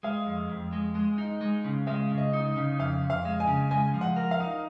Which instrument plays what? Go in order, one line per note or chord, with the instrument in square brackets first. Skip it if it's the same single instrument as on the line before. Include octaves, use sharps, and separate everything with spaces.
[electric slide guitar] G#3 [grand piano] F5
[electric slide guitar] F2
F2
G#3
G#3
D#4
G#3
C#3
[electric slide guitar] G#3 [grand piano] F5
[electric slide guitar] C#3
[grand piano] D#5
[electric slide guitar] D#4
C#3
[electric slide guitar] F2 [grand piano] F5
[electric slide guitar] F2
[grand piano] F5
[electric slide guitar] G#3
[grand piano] G#5
[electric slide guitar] C#3
[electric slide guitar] G#3 [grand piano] G#5
[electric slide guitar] F3
[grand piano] F#5
[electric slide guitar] A#4
[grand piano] F5
[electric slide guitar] D#4